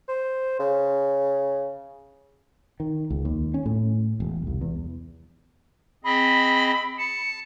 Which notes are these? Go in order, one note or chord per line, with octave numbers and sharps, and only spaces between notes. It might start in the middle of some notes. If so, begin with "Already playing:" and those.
C5
C#3
D#3
C#2
D#2
C#4
A2
E1
C2
E2
C4 G#4 D#5 B5
A5 C#7